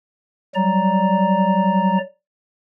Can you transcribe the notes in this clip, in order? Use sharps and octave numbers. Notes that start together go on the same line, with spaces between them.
F#3 G3 D5 A#5